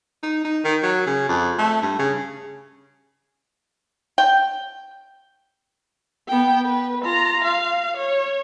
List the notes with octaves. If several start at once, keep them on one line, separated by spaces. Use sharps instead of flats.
D#4
D#4
D#3
F#3
C#3
F2
A3
G2
C#3
G5
B3 G5
B4
F4 A#5
F5
C#5